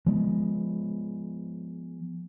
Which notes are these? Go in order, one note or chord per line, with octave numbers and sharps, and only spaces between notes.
F3 G#3 B3